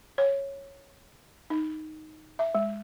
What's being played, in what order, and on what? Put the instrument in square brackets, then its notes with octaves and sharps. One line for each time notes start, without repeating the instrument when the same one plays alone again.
[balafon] C#5
D#4
E5
G#3